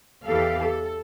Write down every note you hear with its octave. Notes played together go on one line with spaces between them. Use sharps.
E2 E3 G4 A4 F5
A4